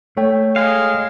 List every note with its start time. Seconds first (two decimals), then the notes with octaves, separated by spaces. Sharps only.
0.17 A3 C#5 G5
0.56 G#3 F5